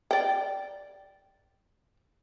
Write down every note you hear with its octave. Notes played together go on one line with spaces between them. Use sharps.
D5 G5